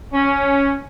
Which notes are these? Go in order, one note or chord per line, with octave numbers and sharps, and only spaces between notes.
C#4